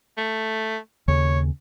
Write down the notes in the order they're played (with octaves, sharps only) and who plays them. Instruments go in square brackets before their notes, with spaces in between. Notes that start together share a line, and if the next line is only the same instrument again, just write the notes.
[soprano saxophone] A3
[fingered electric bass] D#2 C#3 [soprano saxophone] C#5